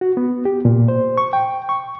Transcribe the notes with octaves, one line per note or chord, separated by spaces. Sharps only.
F#4
B3
G4
A#2
C5
C#6
G5
C#6